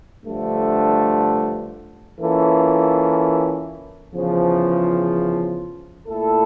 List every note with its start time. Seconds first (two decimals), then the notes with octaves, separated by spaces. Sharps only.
0.25 G2 D3 F3 A3
2.19 E3 A#3 C#4 F4 A4
4.13 E2 C#3 F3
6.07 A#2 A3 E4 A4